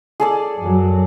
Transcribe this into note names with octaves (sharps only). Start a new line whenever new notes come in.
G#4 A4 D5
F#2 F#3